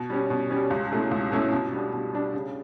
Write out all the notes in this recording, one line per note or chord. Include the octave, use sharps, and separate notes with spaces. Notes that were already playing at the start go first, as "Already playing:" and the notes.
Already playing: B2
G3 C#4
B2
G3 C#4
C#2
B2 A3 C#4 E4
C#2
B2 A3 C#4 E4
B2
G3 D4
B2
G3 D4
C#3